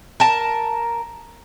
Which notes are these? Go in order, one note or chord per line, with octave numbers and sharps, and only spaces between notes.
A#4 A5